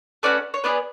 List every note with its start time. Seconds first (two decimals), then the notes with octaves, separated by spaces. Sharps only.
0.23 A3 C#4 F#4 B4 D5
0.54 C#5
0.64 B3 D4 G#4 B4 D5